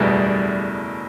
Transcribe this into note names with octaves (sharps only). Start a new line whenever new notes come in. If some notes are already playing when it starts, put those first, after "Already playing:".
Already playing: F#1 E2 B2 G3 A3 E4